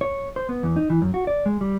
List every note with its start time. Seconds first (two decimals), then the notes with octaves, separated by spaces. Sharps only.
0.01 C#5
0.36 C5
0.49 B3
0.63 E2
0.76 D#4
0.90 E3
1.02 F#2
1.14 F#4
1.27 D5
1.46 G#3
1.61 G3